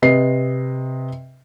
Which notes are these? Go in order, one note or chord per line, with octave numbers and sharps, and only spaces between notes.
C3 B4 D#5 C7